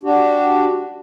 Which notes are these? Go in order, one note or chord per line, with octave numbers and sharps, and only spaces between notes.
D4 F#4 G4